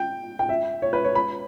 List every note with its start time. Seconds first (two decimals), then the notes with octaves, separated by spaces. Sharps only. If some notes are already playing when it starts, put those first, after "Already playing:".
Already playing: G5
0.39 G5
0.49 E5
0.82 C#5
0.93 B4
1.04 C#5
1.15 B5